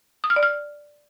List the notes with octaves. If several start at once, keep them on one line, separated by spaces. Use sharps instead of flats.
D#6
F6
D5
F6